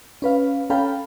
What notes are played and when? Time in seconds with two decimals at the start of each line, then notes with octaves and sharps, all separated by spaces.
0.22 C#4 B4 F5
0.70 C#4 A4 F5 G5 A#5 B5